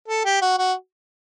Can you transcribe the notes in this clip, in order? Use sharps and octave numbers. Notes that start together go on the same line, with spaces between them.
A4
G4
F#4
F#4